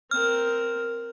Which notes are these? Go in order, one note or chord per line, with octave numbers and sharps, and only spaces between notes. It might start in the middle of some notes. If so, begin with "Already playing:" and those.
C4 A#4 F6